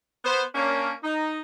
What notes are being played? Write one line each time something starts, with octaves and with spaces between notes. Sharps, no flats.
B3 C5
A#3 C#4 D4
D#4